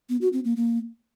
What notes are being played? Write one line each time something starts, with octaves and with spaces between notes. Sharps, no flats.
B3
F#4
C4
A#3
A#3